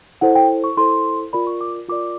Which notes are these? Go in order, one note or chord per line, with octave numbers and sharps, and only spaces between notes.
E4 A4 C5 F#5
G5
C#6
E4 A4 C5 C6
F4 A#4 D5 B5
C#6
D6
F4 A#4 D5 D6